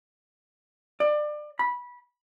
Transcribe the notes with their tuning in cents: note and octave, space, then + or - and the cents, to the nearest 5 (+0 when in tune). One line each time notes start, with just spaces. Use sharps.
D5 +25
B5 -15